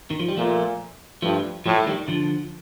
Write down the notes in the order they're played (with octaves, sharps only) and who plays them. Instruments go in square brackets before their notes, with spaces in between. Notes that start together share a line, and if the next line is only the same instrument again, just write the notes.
[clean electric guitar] D#3
F3
G3
[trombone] A#2 [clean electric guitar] F3 A3
[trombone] G2 [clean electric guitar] F3 A3
[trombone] A2 [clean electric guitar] F3 A3
[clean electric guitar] A3
D#3 G3
D3 F3